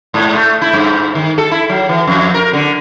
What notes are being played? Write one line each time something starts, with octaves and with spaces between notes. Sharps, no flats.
G#2
A3
E4
G2
D#3
A4
E4
F#3
E3
F2
A#4
D3